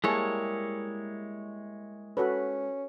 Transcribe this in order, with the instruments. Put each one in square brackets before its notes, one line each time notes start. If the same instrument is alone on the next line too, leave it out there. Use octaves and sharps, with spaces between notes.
[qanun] G3 A#3 [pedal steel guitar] G#3 E4 C#5 [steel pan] G#4 A5
[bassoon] C#4 [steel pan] F#4 A4 B4